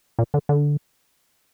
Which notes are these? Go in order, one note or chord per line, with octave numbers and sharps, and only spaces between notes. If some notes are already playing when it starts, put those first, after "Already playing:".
A#2
D3
D3